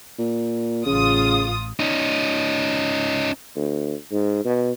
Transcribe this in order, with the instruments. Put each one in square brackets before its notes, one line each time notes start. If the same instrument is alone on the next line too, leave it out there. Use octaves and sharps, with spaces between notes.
[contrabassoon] A#2
[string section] A1 F4 D#6 [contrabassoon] C#3
[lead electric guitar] C#4 D#4
[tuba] D2
G#2
B2